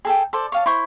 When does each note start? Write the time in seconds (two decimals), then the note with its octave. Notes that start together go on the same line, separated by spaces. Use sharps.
0.05 G#4 A4 G5
0.33 A4 C5 D5
0.52 C#5 F5 A5
0.66 E4 C5 C#6